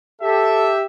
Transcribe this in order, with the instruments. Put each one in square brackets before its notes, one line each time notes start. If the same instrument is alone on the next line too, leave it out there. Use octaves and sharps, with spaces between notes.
[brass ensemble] G4 E5 [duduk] A4